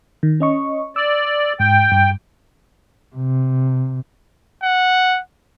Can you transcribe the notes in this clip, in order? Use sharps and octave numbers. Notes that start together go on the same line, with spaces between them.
D#3
C#4 D#5 C#6
D5 E6
G#2 G5
G2
C3
F#5